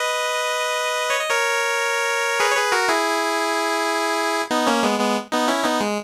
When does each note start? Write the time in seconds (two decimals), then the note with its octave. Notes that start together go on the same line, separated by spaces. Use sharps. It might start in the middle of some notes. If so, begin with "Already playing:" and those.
Already playing: B4 D#5
1.10 C#5
1.19 D#5
1.30 A#4 C#5
2.40 G#4 B4
2.51 C#5
2.56 G#4 B4
2.72 F#4 A#4
2.88 E4 G#4
4.51 B3 D#4
4.67 A#3 C#4
4.83 G#3 B3
5.00 G#3 B3
5.32 B3 D#4
5.48 C#4 E4
5.64 B3 D#4
5.81 G#3